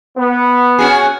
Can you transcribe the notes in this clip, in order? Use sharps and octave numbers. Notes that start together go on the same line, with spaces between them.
B3
C#4 F#4 G#4